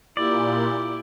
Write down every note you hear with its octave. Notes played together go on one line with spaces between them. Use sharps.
A#2 E4 G4 D5